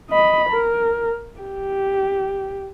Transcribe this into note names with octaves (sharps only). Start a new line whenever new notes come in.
D#5 B5
A#4
G4